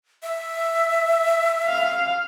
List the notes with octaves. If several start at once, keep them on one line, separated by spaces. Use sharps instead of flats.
E5
F5